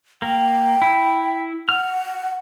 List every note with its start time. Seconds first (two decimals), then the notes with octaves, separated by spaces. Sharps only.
0.22 A#3 G5
0.82 E4
1.69 F#5 F6